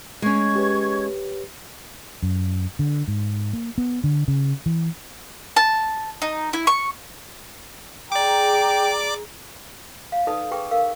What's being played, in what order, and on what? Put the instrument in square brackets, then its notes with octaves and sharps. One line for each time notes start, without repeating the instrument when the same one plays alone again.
[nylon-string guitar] G#3 C#4 [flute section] C#6 G#6
[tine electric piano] G4 B4 C#5
[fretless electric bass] F#2
D3
G#2
A#3
B3
D3
C#3
E3
[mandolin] A5
D#4
E4
C#6
[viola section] G#4 A#5 [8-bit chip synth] D5 D6 [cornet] G5
[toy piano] F5
D#4 A4 B4 D5 A5 D#6
G#4 B4 G5 C#6
A#4 F5